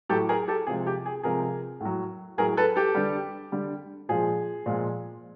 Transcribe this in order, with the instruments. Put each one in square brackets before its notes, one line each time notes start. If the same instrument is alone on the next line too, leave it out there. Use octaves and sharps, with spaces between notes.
[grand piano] A2 F#3 G4 A4
G#4 A#4
G4 A4
C3 F3 G#3 G#4
G4
G#4
C3 F3 G#3 G#4 A#4
A2 F#3
A2 F#3 G#4 A#4
A4 B4
G4 A4
D3 G3
D3 G3
A#2 F3 G#3 G#4
A#2 F3 G#3